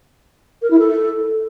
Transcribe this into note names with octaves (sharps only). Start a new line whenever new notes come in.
A#4
E4
A4